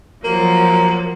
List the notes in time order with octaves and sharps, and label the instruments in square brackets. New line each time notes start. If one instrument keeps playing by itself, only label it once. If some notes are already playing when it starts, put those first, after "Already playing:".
[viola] F3 F#3 [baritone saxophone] A#3